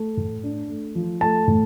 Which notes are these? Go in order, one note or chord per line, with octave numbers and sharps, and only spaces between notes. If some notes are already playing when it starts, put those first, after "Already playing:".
Already playing: A3
A2
D4
A3
F3
A3 A5
A2